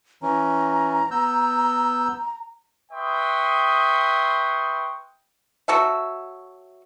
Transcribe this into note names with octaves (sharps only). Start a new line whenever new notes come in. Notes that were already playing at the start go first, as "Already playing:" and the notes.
E3 C#4 A#5
B3 E6 G6
B4 E5 G5 C6 C#6 D#6
F#3 F#4 A4 E5